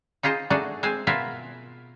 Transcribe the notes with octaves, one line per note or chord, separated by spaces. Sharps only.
D#4 F4 G#4 C5 D#5
A3 D4 D#4 F#4 G#4 A4
G#3 C4 C5 G#5
B2 B3 F4 A#4 E5 G#5